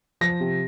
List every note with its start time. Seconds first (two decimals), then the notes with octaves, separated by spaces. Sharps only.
0.21 F3 A#6
0.40 C3